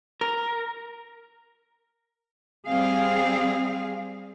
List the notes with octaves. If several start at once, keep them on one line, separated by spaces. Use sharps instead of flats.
A#4
G3 C4 G#4 F5